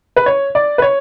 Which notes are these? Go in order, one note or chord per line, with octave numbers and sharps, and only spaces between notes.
B4
C#5
D5
B4
C#5